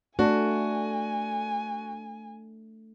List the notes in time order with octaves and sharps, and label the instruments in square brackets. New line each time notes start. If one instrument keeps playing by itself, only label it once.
[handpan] A3 [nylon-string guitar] D4 [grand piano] F#4 [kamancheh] G#5